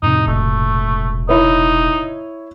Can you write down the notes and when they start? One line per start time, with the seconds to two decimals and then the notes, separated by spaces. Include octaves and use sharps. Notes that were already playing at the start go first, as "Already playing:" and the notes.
0.03 F2 A2 C3 D#4
0.27 E1 A3
1.29 D#4 E4 C#5